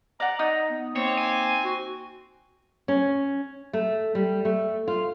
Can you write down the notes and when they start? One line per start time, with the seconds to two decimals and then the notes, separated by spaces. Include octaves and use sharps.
0.20 D5 F#5 A#5
0.39 D#4 D#6
0.70 B3
0.96 A#3 C4 C#5
1.17 G#5
1.64 F#4
2.88 C#4
3.73 A3
4.15 G3
4.45 A3
4.88 F4